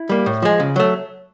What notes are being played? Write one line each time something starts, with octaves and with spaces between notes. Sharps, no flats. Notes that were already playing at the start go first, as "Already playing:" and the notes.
Already playing: E4
G3 A#3
A2
F3 G#3
C#3
F#3 A3